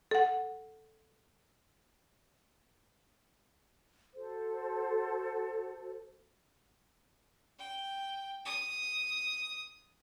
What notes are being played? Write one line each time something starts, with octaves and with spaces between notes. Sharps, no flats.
A4 F#5
F#4 A4 C5
G5
D#6